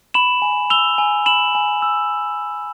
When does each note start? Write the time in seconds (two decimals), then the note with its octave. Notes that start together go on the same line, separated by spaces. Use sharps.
0.14 B5 E7 F#7
0.42 G#5
0.70 E6 F7 G7
0.98 G#5
1.26 B5 E7 F#7
1.55 G#5
1.82 E6